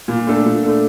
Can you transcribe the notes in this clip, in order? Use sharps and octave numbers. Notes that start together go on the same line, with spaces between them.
A#2
A3 D4 A4
A#2
A3 D4 A4